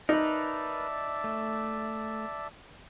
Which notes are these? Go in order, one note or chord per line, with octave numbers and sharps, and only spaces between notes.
D#4 A#4 B4 D5 E5 A5
A3